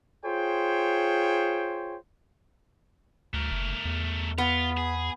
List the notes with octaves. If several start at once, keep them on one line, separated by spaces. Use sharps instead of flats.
F4 G#4 C5 C#5 G5
D2 A3 A#4
F#1
E2
B3 F4
G#4